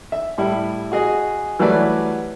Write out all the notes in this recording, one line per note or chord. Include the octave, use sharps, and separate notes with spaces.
E5
A2 G3 E4
F#4 G#4 D#5
E3 F#3 G3 A3 B4 D5